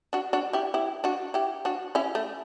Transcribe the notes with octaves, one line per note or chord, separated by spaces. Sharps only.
D4 F#4
D4 F#4
E4 G4
E4 G4
D4 F#4
E4 G4
D4 F#4
C#4 E4
A3